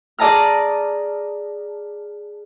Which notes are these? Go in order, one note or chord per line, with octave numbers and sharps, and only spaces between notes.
G#4 D5 D#5 A5 A#5 F6